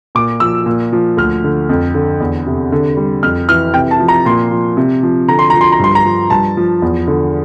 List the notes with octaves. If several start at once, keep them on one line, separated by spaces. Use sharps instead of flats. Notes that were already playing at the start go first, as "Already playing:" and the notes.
A#2 D6
F3 E6
A#2
F3
D2 F6
D3
F2
D3
E2
C3
D3
G3
F2 F6
E3 F6
C3 G5
A5
F3
A#5
A#2 C6
F3
C3
F3
D3 A#5
C6
F3 A#5
C6
A#5
G2 C6
A#5
F3
G2 A5
F3
E2
D3